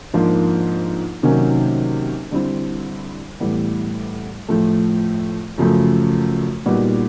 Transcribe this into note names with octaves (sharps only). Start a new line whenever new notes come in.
G#2 F3 A#3 D4 F4
C3 D#3 F#3 A#3 C#4
D3 G3 C4 E4
A2 E3 G3 B3
A2 F3 A3
F#2 C#3 F3 A3
A#2 G3 B3 D#4 F#4